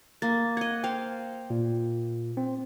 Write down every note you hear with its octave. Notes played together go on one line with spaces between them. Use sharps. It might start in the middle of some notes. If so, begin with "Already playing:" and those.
A#3 A6
D#5 F#5 G#6
C5 F5 G5
A#2
C4